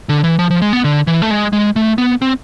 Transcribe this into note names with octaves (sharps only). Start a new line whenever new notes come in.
D3
E3
F3
F3
G#3
B3
D3
E3
A3
G#3
G#3
A3
B3
C4